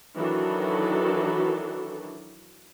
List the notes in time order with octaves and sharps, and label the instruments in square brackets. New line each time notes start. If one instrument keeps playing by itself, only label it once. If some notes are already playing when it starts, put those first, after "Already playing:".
[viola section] D#3 E3 F#3 D4 F#4 A4